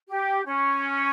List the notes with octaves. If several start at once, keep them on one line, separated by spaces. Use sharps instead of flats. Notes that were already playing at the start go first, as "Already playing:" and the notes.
G4
C#4